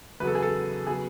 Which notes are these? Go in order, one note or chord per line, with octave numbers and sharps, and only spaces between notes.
E2 C#3 F#3 B4
A4
G#4
A4
C#3 F#3 B3 G#4